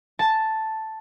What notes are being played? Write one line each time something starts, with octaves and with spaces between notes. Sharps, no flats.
A5